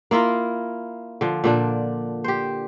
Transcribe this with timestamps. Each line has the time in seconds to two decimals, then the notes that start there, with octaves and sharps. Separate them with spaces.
0.11 A#3 E4 F4 A#4
1.21 D3 F3
1.44 A#2 D3 D4
2.24 G4 C5